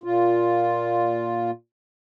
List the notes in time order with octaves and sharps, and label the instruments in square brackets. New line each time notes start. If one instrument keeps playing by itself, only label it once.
[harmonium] A#2 F4